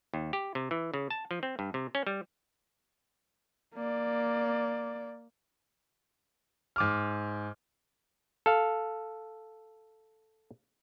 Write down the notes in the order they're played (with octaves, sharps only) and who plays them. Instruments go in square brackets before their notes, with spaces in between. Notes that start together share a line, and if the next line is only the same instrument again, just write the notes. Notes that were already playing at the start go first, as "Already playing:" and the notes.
[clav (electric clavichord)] D#2
G4
C3
E3
C#3
A5
F3
C4
G2
C3
C#4
G3
[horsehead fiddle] A#3 D5
[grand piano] G#2 D6 F6
[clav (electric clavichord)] A4 F5